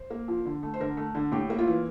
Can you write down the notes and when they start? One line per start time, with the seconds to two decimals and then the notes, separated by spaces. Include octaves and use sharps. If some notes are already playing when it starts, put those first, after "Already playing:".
Already playing: C5
0.10 A#3
0.28 F3
0.45 D3
0.63 A3
0.74 C5
0.80 D3 A#4
0.97 A3
1.15 D3
1.32 A2 G4
1.50 A#3
1.58 F4
1.67 E3